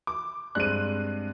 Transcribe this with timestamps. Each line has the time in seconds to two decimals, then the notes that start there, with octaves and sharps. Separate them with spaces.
0.07 D6
0.55 G2 G#3 C4 F#6 D#7